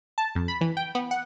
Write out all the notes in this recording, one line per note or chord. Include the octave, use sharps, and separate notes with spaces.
A5
F2
B5
E3
G5
B3
F#5